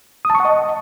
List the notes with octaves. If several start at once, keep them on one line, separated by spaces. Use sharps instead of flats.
D#6
A5
C#6
F#5
D#5